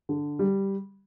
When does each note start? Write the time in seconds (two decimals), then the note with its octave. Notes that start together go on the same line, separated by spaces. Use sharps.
0.09 D3
0.39 G3